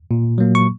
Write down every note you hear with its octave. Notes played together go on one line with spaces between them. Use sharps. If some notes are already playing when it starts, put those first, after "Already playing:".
A#2
F#3 A#3
C#6